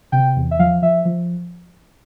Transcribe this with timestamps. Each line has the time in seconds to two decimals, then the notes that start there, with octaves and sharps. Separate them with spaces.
0.12 C3 G5
0.36 E2
0.51 E5
0.59 F3 F5
0.82 F3 E5
1.05 F3